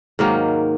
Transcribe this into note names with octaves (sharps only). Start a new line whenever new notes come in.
G#2 D#3 F#3 A#3